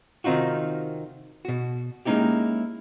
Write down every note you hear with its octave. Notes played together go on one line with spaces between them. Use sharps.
C3 D#3 C4 D#4 F4 F#4
B2 F#4
G#3 A#3 C#4 D#4 E4 G4